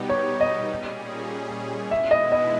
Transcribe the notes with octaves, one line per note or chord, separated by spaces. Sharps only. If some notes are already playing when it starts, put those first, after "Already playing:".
Already playing: B2 G3 B3 D#4 G4
C#5
D#5
A#2 G3 C#4 G#4
B2 G#3 B3 E4 E5
D#5
D#5